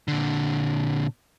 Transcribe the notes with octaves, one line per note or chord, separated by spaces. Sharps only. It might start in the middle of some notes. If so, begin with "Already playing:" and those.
A#2 D3